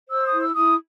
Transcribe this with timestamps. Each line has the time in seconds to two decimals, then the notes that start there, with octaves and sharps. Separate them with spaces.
0.08 C5 E6
0.24 D#6
0.31 E4
0.39 E6
0.53 E4 D#6